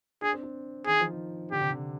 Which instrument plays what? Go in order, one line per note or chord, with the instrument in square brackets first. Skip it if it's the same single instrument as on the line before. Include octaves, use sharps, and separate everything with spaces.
[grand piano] D4 [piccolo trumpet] G#4
[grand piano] C4
D4
[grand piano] D#3 [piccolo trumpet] G#4
[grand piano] F3
D#3
[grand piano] D3 [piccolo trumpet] G4
[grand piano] C3
D3